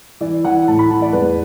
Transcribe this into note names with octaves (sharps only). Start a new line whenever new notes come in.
E3 D5
E3 F#5
A2 A5
B5
E3 A5
D5
E2 B4